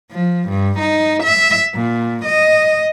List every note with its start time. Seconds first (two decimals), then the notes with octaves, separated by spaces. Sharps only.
0.11 F3
0.49 G2
0.79 D#4
1.23 E5
1.75 A#2
2.25 D#5